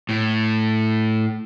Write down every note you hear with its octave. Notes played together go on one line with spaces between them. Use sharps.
A2